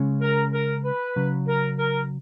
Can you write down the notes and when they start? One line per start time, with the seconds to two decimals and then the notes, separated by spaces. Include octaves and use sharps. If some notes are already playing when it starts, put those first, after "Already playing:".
Already playing: C#3 G#3 C#4
0.22 A#4
0.53 A#4
0.84 B4
1.16 C#3 F#3 C#4
1.48 A#4
1.79 A#4